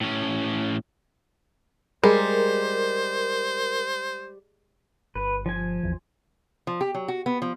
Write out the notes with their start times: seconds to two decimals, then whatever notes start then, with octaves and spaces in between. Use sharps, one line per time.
0.01 A2 C#4
2.04 G3 G#3 A#4 C5
5.15 G1 B4
5.46 F3 G#5
5.83 A1 E2 E3
6.67 F3
6.81 G4
6.95 F#3
7.08 F#4
7.26 B3
7.42 F3